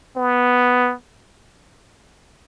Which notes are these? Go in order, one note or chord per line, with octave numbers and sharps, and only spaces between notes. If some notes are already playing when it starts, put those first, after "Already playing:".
B3